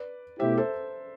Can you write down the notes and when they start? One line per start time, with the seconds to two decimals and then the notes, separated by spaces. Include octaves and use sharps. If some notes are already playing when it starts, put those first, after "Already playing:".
Already playing: B4 D5
0.39 B2 A3 E4 G4 C5 E5
0.57 A4 C5